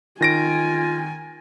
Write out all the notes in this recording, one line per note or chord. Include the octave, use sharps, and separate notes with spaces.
D#3 F4 G#5 A#6 D7